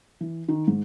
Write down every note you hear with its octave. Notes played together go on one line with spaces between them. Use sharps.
E3
D#3
G#2